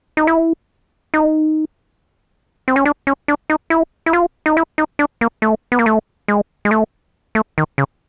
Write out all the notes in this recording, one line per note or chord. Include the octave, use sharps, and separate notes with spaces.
D#4
E4
D#4
C4
C#4
D4
C#4
D4
D#4
E4
E4
F4
D#4
E4
D#4
D4
A#3
A3
B3
A#3
A3
G#3
G#3
A3
A3
D#3
C#3